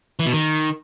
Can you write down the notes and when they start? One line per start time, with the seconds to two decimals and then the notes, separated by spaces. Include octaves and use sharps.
0.20 E3
0.26 B2
0.32 D#3